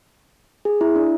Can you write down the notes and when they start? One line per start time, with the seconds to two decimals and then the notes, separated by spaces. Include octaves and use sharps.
0.65 G#4
0.81 E4
0.96 D4